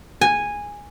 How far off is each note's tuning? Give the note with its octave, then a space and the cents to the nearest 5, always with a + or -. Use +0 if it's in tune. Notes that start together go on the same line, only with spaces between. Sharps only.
G#5 -10